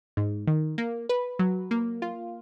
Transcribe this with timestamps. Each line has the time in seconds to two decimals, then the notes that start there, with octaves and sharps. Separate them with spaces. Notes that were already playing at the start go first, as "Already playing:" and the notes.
0.17 G#2
0.47 D#3
0.78 A#3
1.09 B4
1.39 F#3
1.71 A#3
2.02 F4